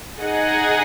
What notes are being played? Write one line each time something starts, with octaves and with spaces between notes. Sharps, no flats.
D#4 G#4 D#5 F#5